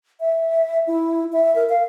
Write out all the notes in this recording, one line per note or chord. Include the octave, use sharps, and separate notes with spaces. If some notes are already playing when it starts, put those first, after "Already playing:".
E5
E4
E5
A#4
F5